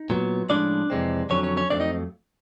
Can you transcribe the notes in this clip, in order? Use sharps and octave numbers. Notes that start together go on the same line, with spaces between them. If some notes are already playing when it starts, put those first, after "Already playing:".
Already playing: D#4
A#2 F#3 B3
A2 F3 G#3 C#4 D4 D5
F2 C3 E3 G#3 C4
F2 D3 F#3 C#4 C#5
C#4 C#5
C#4 C#5
F2 C#3 F#3 A3 C4 D4 D5
D#4 D#5